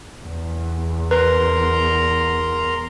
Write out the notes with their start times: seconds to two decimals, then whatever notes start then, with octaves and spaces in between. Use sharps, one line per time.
0.21 E2
1.11 A#4 B4 A#5 C6